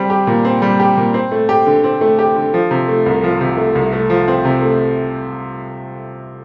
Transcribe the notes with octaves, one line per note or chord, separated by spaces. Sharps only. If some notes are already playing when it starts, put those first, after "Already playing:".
Already playing: G3 C4
G4
A#2
C4
G3
G4
A#2
C4
A3
G4
D3
C4
A3
G4
D3
F3
C3
A3
C2
F3
C3
A3
C2
A3
F3
C4
C3
A3